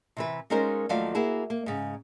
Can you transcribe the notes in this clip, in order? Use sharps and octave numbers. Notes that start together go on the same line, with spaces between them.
C3 E3 B4
G#3 C#4 D#4 F4 A#4 C5
D#2 F3 F#3 A3 D5 F5
A#3 E4 F#4 G#4
A#3
G#2 C#3